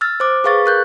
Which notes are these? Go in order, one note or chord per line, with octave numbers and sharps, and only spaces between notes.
E6 F6 A6
C5 D6
G#4 B4 F5 C#6 A6
A#4 F#6 G6